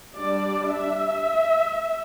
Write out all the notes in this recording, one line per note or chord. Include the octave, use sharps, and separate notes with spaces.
G3 D4 D5
E5